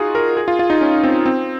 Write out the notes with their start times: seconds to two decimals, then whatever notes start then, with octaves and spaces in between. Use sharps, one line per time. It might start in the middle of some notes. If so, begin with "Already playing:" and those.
Already playing: D#4 F4 F#4 G#4
0.15 A#4
0.37 G#4
0.48 F4
0.59 F4
0.70 D#4
0.81 C#4
1.04 C4
1.26 C4